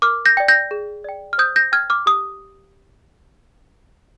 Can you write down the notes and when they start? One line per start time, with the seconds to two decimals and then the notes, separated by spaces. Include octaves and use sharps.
0.02 A#4 D6 F6
0.26 G6 A#6
0.37 D5 G5
0.48 G6 A#6
0.71 G#4
1.04 D5 G5
1.33 F6
1.38 C5 D#6 G6
1.56 G6 A#6
1.72 G5 F6 G#6
1.90 D6 F6
2.06 G4 D#6